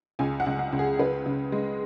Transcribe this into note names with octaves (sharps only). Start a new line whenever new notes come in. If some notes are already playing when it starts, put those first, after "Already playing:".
C#2 G#5
F#5
C#2
F#5
C#2
G#4
C#3 B4
C#3
G#3